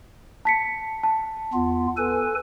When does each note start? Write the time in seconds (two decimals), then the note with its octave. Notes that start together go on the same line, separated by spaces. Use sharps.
0.45 A5 B6 C#7
1.03 A5
1.53 E2 B3 F4
1.97 A4 B4 G#5